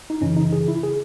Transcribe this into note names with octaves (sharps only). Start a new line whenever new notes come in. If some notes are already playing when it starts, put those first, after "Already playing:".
D#4
F#2 C#3 E3 C#4
D#4
G#4
E4
G#4